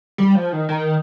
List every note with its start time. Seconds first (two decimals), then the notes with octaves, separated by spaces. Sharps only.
0.18 G3
0.35 F3
0.52 D#3
0.69 D#3